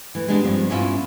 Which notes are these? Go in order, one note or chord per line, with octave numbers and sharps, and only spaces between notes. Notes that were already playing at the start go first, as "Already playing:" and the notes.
E3 A3
G#3 B3 D4 G4
G2 F3 C4
B3 C#4 D4 E4 F4